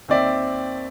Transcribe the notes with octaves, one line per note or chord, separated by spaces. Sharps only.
D#2 C4 D5 E5